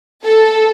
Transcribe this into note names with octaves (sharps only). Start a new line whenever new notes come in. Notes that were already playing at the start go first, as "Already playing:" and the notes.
A4